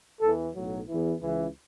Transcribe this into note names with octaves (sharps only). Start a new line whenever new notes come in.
E2 E3 A4
B1 A2 F#3
E2 E3
C#2 C#3 E3